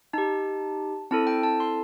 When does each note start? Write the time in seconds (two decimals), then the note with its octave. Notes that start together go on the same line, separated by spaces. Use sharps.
0.13 D#4 G4 A5
1.11 C4 E4 A4 A5
1.27 G5
1.43 A5
1.60 C6